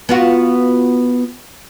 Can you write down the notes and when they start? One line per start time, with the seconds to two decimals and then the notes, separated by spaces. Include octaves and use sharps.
0.09 B3 F4 F#4